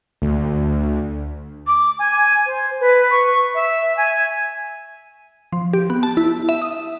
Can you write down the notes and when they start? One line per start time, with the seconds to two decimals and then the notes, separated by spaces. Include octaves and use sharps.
0.22 D2
1.67 D6
1.99 G#5
2.46 C5
2.80 B4
3.11 C#6
3.55 E5
3.97 G#5
5.52 F3
5.73 G4
5.90 B3
6.03 A5
6.17 E4
6.49 E5
6.62 D#6